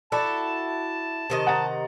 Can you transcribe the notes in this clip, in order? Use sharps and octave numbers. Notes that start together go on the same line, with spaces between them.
E4 F#4 A4 D5 A5
C3 D#3 D#5
F#5 A#5 A6